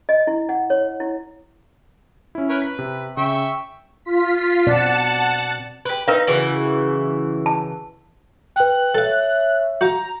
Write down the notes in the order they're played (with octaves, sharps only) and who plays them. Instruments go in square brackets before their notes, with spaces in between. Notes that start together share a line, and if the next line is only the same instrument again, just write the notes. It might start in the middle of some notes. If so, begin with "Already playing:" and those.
[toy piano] D#5
E4
F#5
C#5
E4
[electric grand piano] C#4 E4
[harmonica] A#4 B4 C#5
[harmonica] B4 [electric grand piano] B6
[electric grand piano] C3
[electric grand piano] C#3 [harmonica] E5 G5 C#6
[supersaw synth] F4 B6
[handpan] B2 C4 D5 [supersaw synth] F#5 A5
[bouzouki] G4 B4
[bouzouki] D#4 [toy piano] A#4 B4 F5
[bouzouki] C#3 E3 F#4
[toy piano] A5
[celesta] B4 G5 [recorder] F#6
[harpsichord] A4 F5 [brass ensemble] C#5 E5 [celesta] A6
[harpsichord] F#4 F5 [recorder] A#5 [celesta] G6